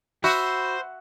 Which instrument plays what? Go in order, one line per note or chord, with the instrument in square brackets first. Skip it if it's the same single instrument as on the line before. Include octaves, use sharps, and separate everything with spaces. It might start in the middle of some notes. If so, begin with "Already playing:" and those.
[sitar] F#4 [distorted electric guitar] C5 [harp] E5 [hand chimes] B5